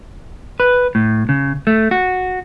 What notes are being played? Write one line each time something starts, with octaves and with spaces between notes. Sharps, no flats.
B4
A2
C#3
A3
F#4